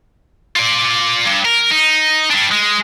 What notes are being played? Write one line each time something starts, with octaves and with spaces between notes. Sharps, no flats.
F4 D5
G2
A#4
D#4
G3 D4
G#3